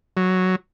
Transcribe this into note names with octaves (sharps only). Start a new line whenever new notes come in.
F#3